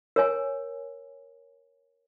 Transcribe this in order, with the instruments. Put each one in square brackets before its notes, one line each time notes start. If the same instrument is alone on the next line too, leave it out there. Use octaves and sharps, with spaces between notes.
[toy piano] A#4 C#5 G#5